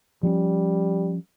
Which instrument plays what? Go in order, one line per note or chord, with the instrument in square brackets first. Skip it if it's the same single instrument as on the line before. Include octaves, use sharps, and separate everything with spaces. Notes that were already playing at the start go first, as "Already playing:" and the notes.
[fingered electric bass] F3 C4 C#4 [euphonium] G3